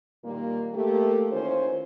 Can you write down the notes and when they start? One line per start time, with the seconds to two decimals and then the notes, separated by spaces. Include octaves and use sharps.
0.24 A#2 D#3 G3 A#3
0.75 A3 A#3 G4
1.31 D#3 E3 C#4 F4 C5